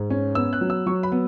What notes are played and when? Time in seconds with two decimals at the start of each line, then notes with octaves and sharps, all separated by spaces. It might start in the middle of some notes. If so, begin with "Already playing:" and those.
Already playing: G#2
0.10 C#4
0.35 B3 E6
0.53 F#6
0.61 F#3
0.70 E6
0.86 F#3 C#6
1.03 B5
1.12 B3